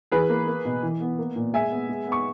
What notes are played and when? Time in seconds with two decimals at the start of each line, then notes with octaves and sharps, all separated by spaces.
0.12 E3 G#4 B4
0.29 A#3
0.47 A#3
0.65 B2
0.83 E3
1.00 B3
1.18 A#3
1.36 A#2
1.53 G#3 E5 G#5
1.71 B3
1.89 G#3
2.07 B3
2.12 C#6